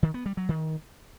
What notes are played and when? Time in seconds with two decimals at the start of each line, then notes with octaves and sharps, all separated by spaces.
0.03 D#3
0.14 B3
0.26 G3
0.37 F#3
0.49 D#3